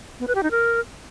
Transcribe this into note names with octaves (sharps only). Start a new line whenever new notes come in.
B3
B4
G4
D#4
A#4